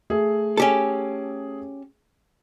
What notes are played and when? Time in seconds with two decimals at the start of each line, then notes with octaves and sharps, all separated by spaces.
0.10 A3 G#4 E5
0.57 C#4 G4 A4